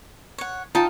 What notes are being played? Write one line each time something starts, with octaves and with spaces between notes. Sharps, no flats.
C#5 F#5
D#4 F4 G5 A5